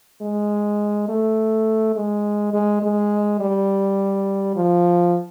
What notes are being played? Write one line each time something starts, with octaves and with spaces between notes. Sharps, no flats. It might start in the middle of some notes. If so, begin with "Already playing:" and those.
G#3
A3
G#3
G#3
G#3
G3
F3